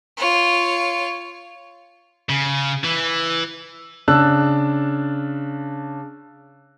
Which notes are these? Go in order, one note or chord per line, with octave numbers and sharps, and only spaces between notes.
F4 C#5
C#3
E3
C#3 D4 A5 E6 F#6